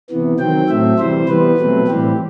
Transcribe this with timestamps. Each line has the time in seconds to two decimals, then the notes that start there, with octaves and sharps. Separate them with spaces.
0.10 C3 E3 B3
0.39 D#3 F#3 C4 G5
0.69 A2 F#3 A3 C4 E5
0.98 C3 E3 G3 C5
1.28 E3 G3 B3 B4
1.58 B2 F#3 A3 C4
1.87 A2 E3 G3 C4 G4